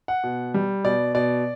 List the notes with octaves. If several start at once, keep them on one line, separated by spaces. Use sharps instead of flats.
F#5
B2
G3
B2 D5
B2 D5